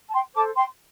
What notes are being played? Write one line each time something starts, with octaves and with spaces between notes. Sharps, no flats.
A5
G5 C6
A4 C5 A5 D6
G5 C6